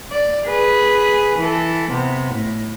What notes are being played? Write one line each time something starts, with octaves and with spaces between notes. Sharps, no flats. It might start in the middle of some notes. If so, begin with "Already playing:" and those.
D5
G#4 B4
E3 A4
C3 B3
A2